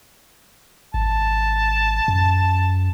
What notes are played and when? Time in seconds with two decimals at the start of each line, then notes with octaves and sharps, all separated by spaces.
0.94 G#1 A5
2.08 F#2